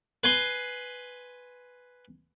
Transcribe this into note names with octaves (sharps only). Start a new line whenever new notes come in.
B4 G#5 C6